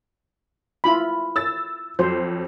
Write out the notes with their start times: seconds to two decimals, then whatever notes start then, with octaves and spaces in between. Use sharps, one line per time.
0.84 E4 F4 B5
1.36 E6 A6
1.99 F2 F#3 C5